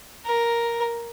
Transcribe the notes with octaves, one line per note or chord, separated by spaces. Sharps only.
A#4